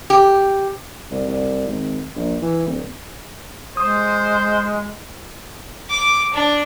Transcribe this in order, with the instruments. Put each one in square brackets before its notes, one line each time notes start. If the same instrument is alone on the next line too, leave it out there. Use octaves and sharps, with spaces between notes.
[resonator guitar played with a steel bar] G4
[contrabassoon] C2
C2
G#1
A#1
E3
D1
[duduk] G#3 [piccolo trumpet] C5 [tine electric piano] D#6
[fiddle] D6
D4